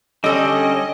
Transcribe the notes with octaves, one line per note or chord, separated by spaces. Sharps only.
D3 G3 C#4 A4 D#5 A5